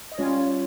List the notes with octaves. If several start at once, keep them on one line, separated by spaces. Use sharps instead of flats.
D#5
G3 C#4 F4 C#5